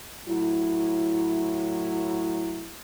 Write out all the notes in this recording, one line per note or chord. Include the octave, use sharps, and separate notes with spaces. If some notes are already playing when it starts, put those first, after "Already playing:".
A2 F#3 E4